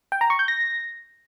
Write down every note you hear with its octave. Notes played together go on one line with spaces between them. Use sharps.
G5
A#5
C#6
G6
A#6